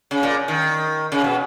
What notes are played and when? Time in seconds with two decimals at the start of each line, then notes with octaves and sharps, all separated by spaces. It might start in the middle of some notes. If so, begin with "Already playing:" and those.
0.11 C#3
0.23 A#2
0.48 D#3
1.12 C#3
1.24 B2